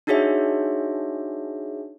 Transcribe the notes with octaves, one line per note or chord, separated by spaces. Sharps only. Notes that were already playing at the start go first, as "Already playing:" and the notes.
D4 D#4 F#4 G#4 C#5 E5